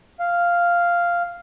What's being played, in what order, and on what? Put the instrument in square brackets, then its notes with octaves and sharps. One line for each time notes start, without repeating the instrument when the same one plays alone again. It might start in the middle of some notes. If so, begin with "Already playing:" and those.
[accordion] F5